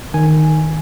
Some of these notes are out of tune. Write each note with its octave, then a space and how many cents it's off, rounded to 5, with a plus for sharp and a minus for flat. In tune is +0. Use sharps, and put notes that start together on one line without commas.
D#3 -5 G#5 +0